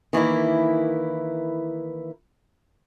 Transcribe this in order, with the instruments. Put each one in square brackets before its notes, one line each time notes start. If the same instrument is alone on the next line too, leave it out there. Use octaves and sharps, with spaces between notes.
[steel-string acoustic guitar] D#3 E3 A#3 E4